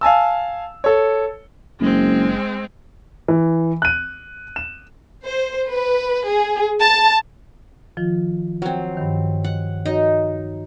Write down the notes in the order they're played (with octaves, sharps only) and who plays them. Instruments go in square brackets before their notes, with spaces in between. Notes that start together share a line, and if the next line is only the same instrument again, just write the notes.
[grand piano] F5 G#5 A5 E6
A4 C#5
[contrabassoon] F#1 [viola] G#3 C4
[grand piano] E3
F#6 D#7
E7
[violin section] C5
B4
G#4
A5
[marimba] D#3 F3 F4
[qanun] F#3 C4
[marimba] G2 D#3
[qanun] F#5
[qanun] D#4 [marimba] F#4 C#5